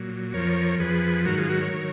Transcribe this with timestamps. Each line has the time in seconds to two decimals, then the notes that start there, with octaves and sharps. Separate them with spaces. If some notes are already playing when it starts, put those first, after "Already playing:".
Already playing: A#2 F#3
0.33 F2 F3 A#4 C#5
0.79 F2 F3 G#4 B4
1.25 G#2 D#3 F#3 F#4 A#4
1.38 F4 G#4
1.49 F#4 A#4
1.60 A#4 C#5
1.72 D#3 F#3